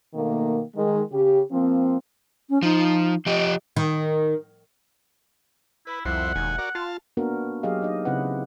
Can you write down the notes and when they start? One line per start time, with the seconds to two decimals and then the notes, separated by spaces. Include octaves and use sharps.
0.15 B2 D#3 A3 A#3
0.76 D#3 G#3
1.11 C#3 G4
1.51 F3 A#3 C4
2.49 C#4
2.62 F3 D#4
3.26 F3 G4 D#5
3.76 D#3
5.87 E4 B4
6.05 C2 F2 E4 C5 F#5
6.35 E1 D#2 G#5
6.58 F#4 A#4 D5
6.75 F4 F5 A5
7.17 A#3 B3 D4 F#4 A#4
7.63 F#3 G4 G#4 D#5 F5
7.82 D#4 D#5
8.05 C#3 C4 C#4 E4 B4 F#5